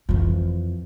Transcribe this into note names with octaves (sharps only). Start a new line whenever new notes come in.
F2 E3